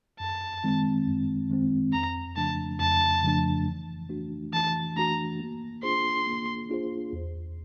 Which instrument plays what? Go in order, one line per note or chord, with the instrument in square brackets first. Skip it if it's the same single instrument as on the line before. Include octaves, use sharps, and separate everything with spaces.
[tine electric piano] F#2 [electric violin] A5
[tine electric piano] D#3 G#3 C4
F#2
D#3 G#3 C4
[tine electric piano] F2 [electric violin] A#5
[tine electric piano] C#3 F3 A3 D4 [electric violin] A5
[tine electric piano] F2 [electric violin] A5
[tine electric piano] C#3 F3 A3 D4
E3
A3 D4 F#4
[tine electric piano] E3 [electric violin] A5
[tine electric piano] A3 D4 F#4 [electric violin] A#5
[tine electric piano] A#3
[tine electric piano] D4 F4 G#4 C5 [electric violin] C6
[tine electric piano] A#3
D4 F4 G#4 C5
E2